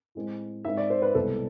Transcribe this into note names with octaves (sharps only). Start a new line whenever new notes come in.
A2 G#3 C4
G#2 G#3 C4 E5
D5
C5
B4
C2 B2 G#3 A4